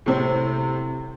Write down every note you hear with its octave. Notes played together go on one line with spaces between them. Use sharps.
A2 C3 C4